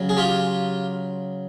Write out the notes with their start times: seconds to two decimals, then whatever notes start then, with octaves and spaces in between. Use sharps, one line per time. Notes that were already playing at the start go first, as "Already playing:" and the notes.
Already playing: C#3 F#3
0.09 G#4
0.17 F4 G4